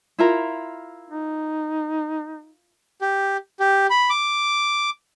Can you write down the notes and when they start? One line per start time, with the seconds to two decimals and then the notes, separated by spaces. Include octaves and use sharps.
0.18 E4 F4 A#4
1.10 D#4
3.01 G4
3.60 G4
3.90 B5
4.10 D6